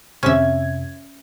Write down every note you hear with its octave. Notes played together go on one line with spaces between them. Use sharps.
F2 C3 C#4 E5 G#6